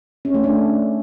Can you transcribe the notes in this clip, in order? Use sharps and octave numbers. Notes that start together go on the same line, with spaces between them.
C#4
A3
D4